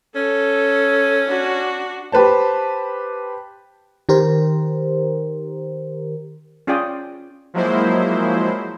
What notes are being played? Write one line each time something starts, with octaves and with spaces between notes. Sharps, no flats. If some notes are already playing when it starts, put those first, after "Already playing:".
C#4 A4
D4 F#4
G4 B4 C5 A5
D#3 G4 A#4 C5
C#4 F4 G#4 D5 G5 D#6
F3 F#3 G#3 A#3 E4 C5